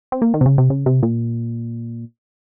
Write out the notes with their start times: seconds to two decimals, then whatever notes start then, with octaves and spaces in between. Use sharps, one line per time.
0.12 C4
0.22 A#3
0.34 D#3
0.41 C3
0.46 C#3
0.58 C3
0.70 C#3
0.86 C3
1.03 A#2